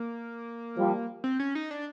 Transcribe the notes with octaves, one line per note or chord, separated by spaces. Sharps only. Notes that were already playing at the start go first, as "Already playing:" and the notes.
Already playing: A#3
F3 G3
C4
C#4
D#4
D4